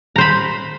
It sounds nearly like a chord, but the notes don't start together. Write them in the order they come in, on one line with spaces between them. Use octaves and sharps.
A#5 C5 B5